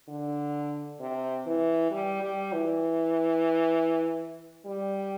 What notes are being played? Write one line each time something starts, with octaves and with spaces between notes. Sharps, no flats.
D3
C3
E3
G3
G3
E3
G3